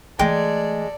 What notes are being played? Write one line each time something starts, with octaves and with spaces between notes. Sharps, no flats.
E3 G#3 A3 A4 D5 G5